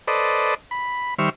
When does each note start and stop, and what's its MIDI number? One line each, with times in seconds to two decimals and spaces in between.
0.08 0.54 69
0.08 0.54 71
0.08 0.54 72
0.08 0.54 74
0.08 0.54 75
0.71 1.14 83
1.19 1.30 51
1.19 1.30 55
1.19 1.30 72
1.19 1.30 76
1.19 1.30 85
1.19 1.30 89